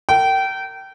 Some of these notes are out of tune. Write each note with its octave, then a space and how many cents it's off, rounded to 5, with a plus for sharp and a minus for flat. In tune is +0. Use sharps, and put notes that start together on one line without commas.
A#4 -35 G5 -25